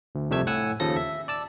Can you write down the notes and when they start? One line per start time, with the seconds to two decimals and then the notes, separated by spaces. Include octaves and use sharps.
0.15 D2
0.30 C2 F2 C3 A3 E6 G#6
0.47 A2 F#5 G#5 E6
0.80 D#2 C#3 F3 A4 A#6
0.96 E5
1.28 D5 A5 E6